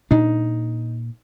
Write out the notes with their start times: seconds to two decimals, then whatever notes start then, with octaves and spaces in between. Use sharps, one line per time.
0.11 A#2 D4 D#4